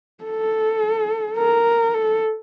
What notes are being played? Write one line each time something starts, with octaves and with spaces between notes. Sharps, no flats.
A4
A#4
A4